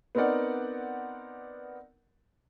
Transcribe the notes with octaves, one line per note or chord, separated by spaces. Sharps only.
B3 C4 D#4 A#4 D5 F#5